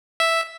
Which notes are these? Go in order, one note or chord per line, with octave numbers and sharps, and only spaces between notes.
E5